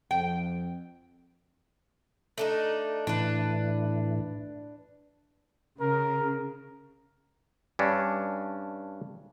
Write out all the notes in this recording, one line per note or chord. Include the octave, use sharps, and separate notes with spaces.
F2 G5
A3 D4 D#4
A2 E3 D4 B4
C#3 A#4
G2 C#4 D4